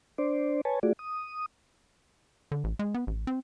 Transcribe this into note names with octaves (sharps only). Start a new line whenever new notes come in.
D4 C5 D5
B4 C#5 G#5 A5
A3 F4 F#4 G#4 D5
D#6
D3
A1
G#3
B3
A1
C4